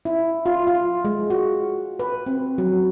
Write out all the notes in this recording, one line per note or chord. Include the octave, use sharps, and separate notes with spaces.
E4
F4
F4
G#3
F#4
B4
C4
F#3